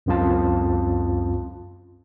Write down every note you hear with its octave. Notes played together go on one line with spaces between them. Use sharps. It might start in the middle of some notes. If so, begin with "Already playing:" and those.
C#2 F#2 C4 F4 A5